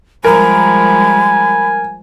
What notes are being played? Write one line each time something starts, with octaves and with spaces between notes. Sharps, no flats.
F3 G3 G#3 A#4 G#5 B5